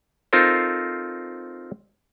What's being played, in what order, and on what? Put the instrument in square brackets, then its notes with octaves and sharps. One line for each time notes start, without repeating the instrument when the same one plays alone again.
[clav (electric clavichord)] C4 D#4 F4 A4 A#4 C5